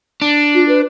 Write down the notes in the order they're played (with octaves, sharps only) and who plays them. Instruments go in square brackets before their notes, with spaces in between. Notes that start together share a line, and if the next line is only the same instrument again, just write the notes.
[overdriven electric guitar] D4
[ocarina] F4
B4